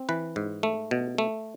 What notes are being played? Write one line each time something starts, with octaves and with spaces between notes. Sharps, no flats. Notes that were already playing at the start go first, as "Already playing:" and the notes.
Already playing: C4
E3 B4
G#2
A3
B2
A3